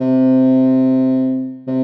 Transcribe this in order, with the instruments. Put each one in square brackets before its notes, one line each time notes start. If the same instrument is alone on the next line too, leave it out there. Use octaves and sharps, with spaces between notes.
[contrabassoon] C3
C3